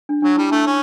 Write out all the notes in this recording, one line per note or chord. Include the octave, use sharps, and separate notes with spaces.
D4
F#3 D4
G3 E4
A3 D4
C#4